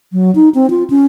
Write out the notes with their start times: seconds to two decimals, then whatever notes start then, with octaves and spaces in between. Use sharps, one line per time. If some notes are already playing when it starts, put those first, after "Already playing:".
0.13 F#3
0.35 D#4
0.55 C4
0.70 F4
0.90 C#4